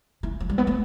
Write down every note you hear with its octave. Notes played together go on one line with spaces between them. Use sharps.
E3
F3
G3
B3
A3